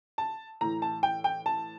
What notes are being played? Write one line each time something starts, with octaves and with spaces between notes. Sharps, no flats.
A5
A2 E3 A#5
A5
G5
G5
A5